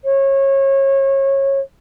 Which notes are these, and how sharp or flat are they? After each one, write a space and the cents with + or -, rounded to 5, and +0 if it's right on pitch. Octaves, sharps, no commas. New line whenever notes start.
C#5 -25